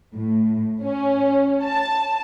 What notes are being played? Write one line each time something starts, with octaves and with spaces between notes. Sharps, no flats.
A2
C#4
A5